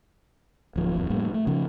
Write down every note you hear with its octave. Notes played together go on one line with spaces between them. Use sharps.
D1 F3
D1 B1 F2
A2 G3 A#3
A3
C#3 F3